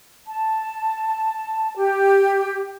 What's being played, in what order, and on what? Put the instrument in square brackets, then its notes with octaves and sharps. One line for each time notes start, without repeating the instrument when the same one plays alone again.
[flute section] A5
G4